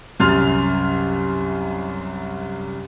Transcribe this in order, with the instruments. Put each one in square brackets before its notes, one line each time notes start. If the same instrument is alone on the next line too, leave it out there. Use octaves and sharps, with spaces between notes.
[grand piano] C2 F#2 C6 F6 A6 F7